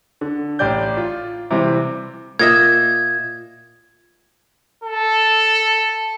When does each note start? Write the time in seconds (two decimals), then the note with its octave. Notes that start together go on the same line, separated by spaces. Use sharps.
0.21 D3
0.59 A1 G4 D5 G6
0.97 F4
1.50 C3 E3 G3 C4
2.39 A#2 D#5 E5 G#6
4.84 A4